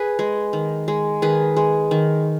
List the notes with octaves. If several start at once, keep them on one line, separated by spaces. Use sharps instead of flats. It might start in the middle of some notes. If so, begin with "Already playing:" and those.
Already playing: G#4 B4
G#3
D#3
G#3
D#3 G#4 B4
G#3
D#3